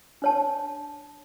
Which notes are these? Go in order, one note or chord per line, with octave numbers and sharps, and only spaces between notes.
D4 C#5 A5